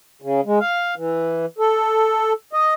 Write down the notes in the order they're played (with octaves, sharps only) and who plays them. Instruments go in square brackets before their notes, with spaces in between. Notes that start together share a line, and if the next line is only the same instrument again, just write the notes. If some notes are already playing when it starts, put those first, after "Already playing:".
[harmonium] C#3
G#3
F5
E3
A4
D#5